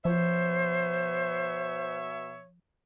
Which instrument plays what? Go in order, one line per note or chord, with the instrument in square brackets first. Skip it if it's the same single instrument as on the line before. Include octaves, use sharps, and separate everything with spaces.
[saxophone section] B2 C#5 E5 [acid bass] F3 [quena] C5